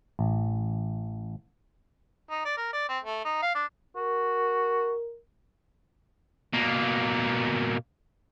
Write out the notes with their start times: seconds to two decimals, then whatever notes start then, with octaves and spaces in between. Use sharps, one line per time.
0.19 A1
2.31 D#4
2.45 D5
2.57 A#4
2.73 D5
2.89 C4
3.03 A3
3.25 D#4
3.42 F5
3.55 D4
3.96 F#4 A#4
6.54 B2 A#3